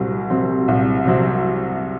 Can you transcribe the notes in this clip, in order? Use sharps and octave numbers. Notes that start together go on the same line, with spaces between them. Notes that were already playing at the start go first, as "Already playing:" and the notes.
Already playing: C2 C3 F#3 C4
C3 F#3 C4
C2
C3 F#3 C4